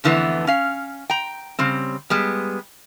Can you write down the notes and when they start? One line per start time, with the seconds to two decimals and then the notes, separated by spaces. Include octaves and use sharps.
0.04 F2 D3 E3 A3 B3
0.47 C#4 F5
1.10 G5 A#5
1.59 C#3 G3 C4
2.10 G3 G#3 B3